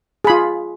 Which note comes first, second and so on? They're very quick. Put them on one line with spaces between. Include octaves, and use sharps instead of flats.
G#4 B5 F4